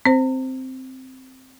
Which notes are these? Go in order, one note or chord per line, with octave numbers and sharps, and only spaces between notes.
C4 C5